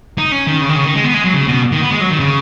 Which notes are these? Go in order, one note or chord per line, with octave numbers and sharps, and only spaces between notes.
D#4
C#4
D#3
C#3
D#3
C#3
D#3
G#3
B3
G#3
F#3
C#3
B2
D#3
B3
G#3
F#3
D#3
C#3